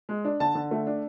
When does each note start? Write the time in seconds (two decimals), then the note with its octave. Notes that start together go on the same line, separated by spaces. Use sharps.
0.09 G#3
0.25 D4
0.40 D3 A5
0.55 D3
0.71 A3
0.87 D4